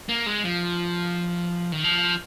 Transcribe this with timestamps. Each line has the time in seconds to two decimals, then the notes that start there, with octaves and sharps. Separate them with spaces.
0.09 A#3
0.26 G#3
0.44 F3
1.72 D#3
1.84 F3